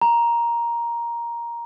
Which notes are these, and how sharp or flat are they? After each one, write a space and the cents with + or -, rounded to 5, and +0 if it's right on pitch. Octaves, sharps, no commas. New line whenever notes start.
A#5 +10